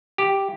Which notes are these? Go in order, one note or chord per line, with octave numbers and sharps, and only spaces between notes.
G4